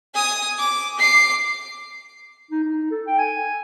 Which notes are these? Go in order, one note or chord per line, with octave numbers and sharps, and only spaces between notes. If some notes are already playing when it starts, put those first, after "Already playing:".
G#5 D#6
D6
D6 C7
D#4
D#4
A4
G5
G#5